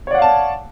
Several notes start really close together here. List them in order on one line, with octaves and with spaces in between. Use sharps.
C#5 D5 F#5 F5 A5